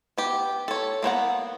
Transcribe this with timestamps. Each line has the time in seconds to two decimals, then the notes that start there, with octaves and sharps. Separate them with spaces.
0.18 B3 G4
0.68 A4 C#5
1.03 A#3 B3 C5 F#5